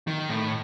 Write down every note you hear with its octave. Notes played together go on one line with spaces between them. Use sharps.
D#3
A2